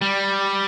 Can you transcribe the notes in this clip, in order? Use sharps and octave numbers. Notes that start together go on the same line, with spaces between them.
G3